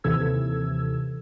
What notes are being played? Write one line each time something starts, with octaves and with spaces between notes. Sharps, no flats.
D#2 C3 E3 A4 E6 G#6